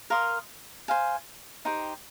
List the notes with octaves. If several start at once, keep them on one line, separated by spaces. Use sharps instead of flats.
A#4 F5 C6 D#6
C5 F5 G#5
D#4 G4 C5 G5